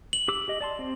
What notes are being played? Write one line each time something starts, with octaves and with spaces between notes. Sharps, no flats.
F#7
G4 D6 E6
G4 D#5
D5 A5 C6
C4